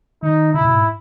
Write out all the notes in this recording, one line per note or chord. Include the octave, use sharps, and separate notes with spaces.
D#3 D#4
C#3 E4
A#2
B2
G#2